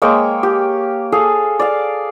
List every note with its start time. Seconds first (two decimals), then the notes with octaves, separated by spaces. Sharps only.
0.02 G#3 A#3 C#5 G5
0.43 G4
1.12 G#4 A4 F5
1.59 D5 F5